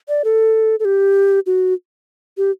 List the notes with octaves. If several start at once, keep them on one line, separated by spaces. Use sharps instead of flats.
D5
A4
A4
G4
F#4
G4